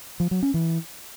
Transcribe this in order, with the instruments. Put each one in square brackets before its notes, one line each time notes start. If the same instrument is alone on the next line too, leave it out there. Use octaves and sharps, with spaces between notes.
[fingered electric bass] F3
F#3
C#4
E3